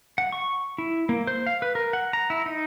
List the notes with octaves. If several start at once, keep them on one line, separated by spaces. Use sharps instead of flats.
F#5
C#6
E4
A#3
C5
F5
B4
A#4
F#5
A#5
E4
D#4